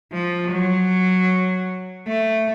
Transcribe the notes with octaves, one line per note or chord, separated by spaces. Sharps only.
F3
F#3
A3